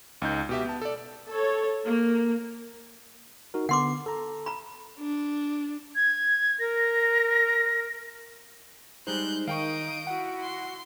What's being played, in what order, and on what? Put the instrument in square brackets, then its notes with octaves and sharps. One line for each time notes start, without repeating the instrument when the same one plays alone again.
[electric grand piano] C#2 D#4 G6
B2 G4 E5
B3 A5
A4 D5
[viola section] A4 C#5
A#3
[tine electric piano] D#4 F#4 A#4
[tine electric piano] D3 B3 [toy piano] F#5 C6 D6
[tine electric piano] A4 A#5
[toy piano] A#5 B5
[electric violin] D4
[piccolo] G#6
[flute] A#4 [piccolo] A#6
[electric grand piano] G3 G#3 C5 [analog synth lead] D#4 [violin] F#6 G6
[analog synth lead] D#3 [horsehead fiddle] D#4 [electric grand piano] F5 G5 C#6 [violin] D#6 D7
[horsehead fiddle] E4 F#4 [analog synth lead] F#5
[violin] C6